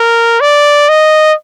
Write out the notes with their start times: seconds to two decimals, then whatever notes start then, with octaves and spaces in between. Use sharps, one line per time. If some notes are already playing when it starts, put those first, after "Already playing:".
Already playing: A#4
0.41 D5
0.89 D#5